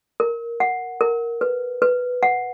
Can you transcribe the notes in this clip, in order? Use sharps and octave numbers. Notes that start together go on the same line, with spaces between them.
A#4
F#5
A#4
B4
B4
F#5